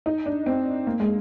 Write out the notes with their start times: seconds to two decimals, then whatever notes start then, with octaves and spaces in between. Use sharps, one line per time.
0.06 D#4
0.26 D4
0.46 C4
0.87 A#3
1.00 G#3